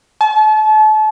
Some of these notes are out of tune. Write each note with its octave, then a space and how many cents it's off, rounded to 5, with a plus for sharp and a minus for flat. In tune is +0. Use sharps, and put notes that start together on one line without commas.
A5 -35